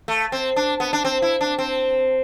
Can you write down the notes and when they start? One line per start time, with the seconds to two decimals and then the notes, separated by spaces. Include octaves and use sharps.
0.08 A3
0.32 C4
0.56 D4
0.80 B3
0.93 D4
1.05 C4
1.22 E4
1.41 D4
1.59 C4